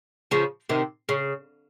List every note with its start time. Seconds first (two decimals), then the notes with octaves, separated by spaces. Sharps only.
0.31 C#3 F3
0.69 C3 D#3
1.09 C#3